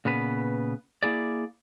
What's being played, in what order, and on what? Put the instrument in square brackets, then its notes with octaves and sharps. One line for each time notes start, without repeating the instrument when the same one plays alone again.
[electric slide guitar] A#2 C#3 B3 B4
A#3 E4 G#4 D5